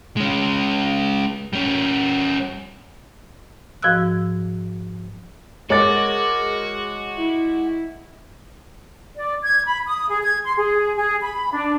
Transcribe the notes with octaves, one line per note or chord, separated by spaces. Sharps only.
G#3 C#4
G3 C#4
G#2 F3 F#4 D#5 E6 F#6
G#3 F#4 G#4 A#4 C#5 D6 A6
E4
D5
G#6
B5
D#6
G#4
G#6
C6
G#4
G#4
B5
D4